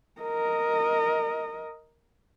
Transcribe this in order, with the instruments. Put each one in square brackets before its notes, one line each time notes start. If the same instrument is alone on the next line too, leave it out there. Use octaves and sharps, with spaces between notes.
[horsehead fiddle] A#4 D#5